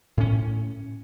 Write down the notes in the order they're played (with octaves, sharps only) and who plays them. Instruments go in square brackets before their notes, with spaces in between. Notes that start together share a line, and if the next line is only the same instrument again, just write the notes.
[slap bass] A2 C#4